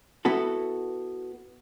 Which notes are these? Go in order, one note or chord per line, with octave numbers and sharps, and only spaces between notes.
B3 E4 F#4 A4